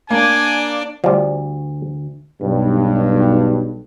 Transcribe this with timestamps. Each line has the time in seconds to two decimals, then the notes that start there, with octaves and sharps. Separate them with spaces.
0.10 A#3 D4 D5 G#5
1.04 D2 F3 G3
2.41 B1 G2